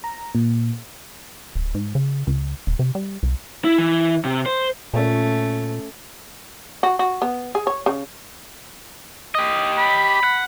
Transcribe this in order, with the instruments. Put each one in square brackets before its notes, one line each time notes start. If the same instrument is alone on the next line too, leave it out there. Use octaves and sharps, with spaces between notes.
[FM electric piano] A#5
A#2
[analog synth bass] D1
G#2
C#3
C#2
D#1
C3
G3
C2
[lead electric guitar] E4
E3
C3
C5
[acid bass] A#2 [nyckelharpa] A3 C#4
[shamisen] F#4
F#4
B3
G#4
C#5
C#3
[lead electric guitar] G4 D#5
[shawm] B5
[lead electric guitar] F#5